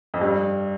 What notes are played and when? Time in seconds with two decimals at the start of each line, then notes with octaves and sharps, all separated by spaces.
0.14 F2
0.21 G2